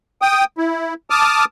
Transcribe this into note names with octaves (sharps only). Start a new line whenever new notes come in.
G5 D#6
E4
A5 D6 D#6 F6